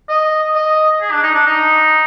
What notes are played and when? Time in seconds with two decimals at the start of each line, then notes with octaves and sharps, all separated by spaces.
0.09 D#5
0.55 D#5
1.01 G#4
1.12 D4
1.23 D#4
1.34 D4
1.46 D#4